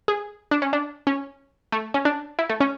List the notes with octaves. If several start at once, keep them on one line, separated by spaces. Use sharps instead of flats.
G#4
D4
C#4
D4
C#4
A3
C#4
D4
E4
A3
C#4